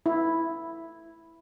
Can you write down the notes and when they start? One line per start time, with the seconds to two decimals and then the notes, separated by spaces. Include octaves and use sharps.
0.06 E4